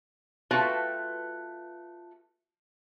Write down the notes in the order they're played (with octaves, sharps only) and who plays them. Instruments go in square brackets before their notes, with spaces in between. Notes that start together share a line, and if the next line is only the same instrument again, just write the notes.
[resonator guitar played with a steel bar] A3 F4 F#4 B4 G5 A5